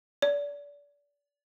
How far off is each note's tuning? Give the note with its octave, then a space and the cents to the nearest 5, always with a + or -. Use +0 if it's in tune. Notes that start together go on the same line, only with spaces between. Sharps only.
D5 -30